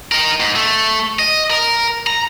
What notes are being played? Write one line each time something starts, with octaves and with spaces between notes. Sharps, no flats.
D#4 A#4
G#2
A3
D#5
A#4
A#5